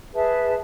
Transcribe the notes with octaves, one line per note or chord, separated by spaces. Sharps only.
G#4 B4 E5 A5